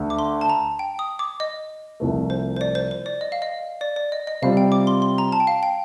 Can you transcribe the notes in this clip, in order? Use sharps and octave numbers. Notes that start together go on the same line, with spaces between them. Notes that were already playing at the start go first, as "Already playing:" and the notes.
Already playing: D2 D3 A3
D6
C6
A5
A#5
G5
D#6
D6
D#5
C2 C3 F3 A3
C5
C5
D5
C5
C5
D5
D#5
F5
D#5
D5
D5
D#5
D#5
C3 G3 C4 F4 F5
G5
D6
C6
C6
A#5
A5
G5
F5
G5